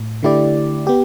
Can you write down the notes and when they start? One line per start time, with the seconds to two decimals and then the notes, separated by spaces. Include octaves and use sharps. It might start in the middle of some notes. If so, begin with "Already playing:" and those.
Already playing: A2
0.23 D3 A3 E4 G4 D5
0.87 B3 G4